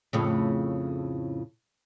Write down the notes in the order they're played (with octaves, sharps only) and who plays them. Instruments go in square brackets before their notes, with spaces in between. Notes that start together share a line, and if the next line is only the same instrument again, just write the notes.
[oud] F2 A2 C#3